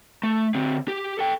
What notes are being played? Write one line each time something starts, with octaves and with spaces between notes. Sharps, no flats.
A3
D3 C4
G4
A4 G5